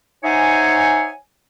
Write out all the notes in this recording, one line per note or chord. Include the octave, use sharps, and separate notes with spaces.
D#4 C5 C#5 E5 F#5 G#5